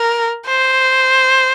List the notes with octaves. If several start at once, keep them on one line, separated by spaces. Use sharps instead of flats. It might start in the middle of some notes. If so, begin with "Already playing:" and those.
Already playing: A#4
C5